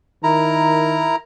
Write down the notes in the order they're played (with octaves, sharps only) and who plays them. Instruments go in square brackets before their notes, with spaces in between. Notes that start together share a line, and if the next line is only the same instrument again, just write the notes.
[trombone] D#3 [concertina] E4 A#4 A#5